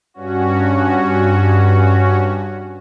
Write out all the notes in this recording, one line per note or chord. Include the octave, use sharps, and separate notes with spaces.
G2 C#4 F#4